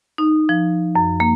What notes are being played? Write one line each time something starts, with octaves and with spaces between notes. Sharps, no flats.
D#4
F3
F#2
A#3